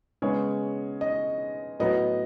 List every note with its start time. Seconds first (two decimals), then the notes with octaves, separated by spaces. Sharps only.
0.22 C#3 G#3 B3 C#5
1.01 D#5
1.80 A2 F#3 B3 D#5